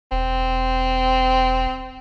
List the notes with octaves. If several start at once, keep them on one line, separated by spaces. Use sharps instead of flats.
E1 C4